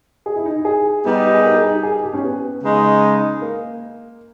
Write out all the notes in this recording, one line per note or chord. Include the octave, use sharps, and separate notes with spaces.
G#4
E4
D#4
D#4
G#4
G3 B3 D#4 G4
G4
G#4
A#4
G#4
D#4
G4
G#4
G4
C#4
B3
C#3 G#3 D#4
A#3